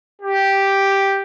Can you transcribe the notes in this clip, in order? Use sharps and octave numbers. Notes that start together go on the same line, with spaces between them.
G4